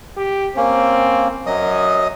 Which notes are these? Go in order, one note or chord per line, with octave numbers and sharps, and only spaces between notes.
G4
A#3 C4 C#4
F#2 F#3 D#5 D#6